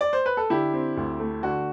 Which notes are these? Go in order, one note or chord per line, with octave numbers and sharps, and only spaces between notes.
D5
C5
B4
A4
D3 E4 G4
C4
D2
A3
D3 F#4